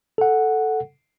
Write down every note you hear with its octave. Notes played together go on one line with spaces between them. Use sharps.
A4 F#5